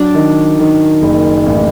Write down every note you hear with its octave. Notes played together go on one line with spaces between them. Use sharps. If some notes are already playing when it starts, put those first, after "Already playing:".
Already playing: F#3 D4
D#3
D#3
F#1
A1